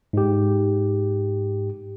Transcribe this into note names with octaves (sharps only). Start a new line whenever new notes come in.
G#2 G4